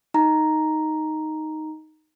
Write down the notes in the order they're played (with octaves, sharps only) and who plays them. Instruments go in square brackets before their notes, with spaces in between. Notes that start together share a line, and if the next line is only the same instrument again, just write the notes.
[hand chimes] D#4 A#5